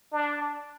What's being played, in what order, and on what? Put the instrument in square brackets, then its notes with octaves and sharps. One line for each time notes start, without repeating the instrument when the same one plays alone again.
[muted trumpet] D4